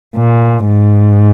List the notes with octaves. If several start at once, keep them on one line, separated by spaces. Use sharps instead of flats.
A#2
G#2